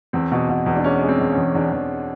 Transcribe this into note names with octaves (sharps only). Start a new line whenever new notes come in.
E2 C4
B2
B2
E2
D4
G#3 C#4
G#3
C4
E2
C#4
E2
E2 D4
E2